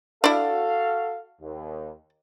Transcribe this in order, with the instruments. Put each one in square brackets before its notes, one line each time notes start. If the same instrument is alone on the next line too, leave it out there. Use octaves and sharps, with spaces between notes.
[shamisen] D4 E4 [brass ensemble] F#4 A4 F5
[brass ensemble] D#2